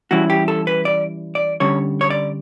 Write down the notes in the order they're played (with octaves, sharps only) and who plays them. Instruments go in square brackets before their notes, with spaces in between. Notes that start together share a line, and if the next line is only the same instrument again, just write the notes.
[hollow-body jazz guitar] E3 G3 C#4 E4 F#4
G4
A4
B4
D5
D5
D3 G3 C#4 C#5
C#5
D5